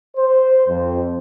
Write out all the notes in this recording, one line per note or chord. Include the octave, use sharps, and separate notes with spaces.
C5
F2